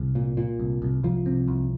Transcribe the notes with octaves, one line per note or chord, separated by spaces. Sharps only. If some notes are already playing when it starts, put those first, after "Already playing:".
Already playing: C2
A#2
A#2
C2
C2
C2 F3
C3
C2